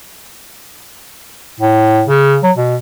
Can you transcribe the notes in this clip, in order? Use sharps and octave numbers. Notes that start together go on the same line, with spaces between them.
A2
C#3
F#3
B2